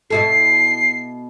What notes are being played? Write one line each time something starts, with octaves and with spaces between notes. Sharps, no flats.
B2 E4 A4 C7